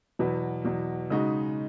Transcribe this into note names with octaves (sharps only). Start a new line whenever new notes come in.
E2 B2 F#3 B3
E2 B2 F#3
C#3 G#3 D#4 F#4